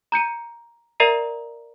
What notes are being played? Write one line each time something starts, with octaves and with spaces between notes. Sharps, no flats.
A#5 G6 C#7 D#7
A#4 D5 E5 A#5 C7 D#7